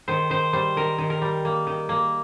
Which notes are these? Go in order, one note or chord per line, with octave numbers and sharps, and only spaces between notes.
D#3 C5
D#3 C5
G3 C5
D#3 A#4
D#3
A#4
G3
A#3
D#3
A#3